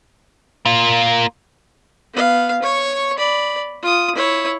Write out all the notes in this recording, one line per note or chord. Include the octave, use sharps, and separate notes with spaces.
A#3 F4
B3 F5
C#5 C#6
D5 B5
F4 D#6
E4 C#5